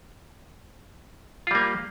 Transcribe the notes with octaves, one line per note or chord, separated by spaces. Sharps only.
G3 A#3 F4